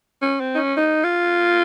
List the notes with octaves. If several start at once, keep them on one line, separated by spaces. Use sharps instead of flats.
C#4
C4
D#4
C#4
D#4
F4